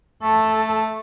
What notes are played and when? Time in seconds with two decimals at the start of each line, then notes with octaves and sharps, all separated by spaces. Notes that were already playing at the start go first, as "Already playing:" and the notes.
0.23 A3 A4